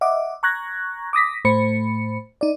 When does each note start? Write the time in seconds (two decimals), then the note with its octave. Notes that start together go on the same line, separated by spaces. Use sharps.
0.01 D#5 E5 F#5 D6
0.43 A#5 C#6 F#6 G#6 A#6
1.13 D6 D#6 A#6 B6
1.45 A2 A3 C5 B5 C#7
2.41 D#4 D5